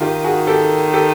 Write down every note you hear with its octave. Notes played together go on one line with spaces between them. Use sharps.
D#3 F4 G4
F#4 G#4
G4 A4
G4 A4